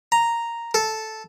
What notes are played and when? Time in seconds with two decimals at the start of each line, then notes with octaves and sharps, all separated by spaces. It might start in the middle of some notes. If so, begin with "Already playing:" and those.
0.12 A#5
0.74 A4